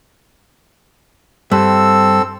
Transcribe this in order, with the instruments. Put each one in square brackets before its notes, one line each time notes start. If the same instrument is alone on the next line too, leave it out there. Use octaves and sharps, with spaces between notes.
[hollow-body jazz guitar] G2 [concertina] C4 A4 E6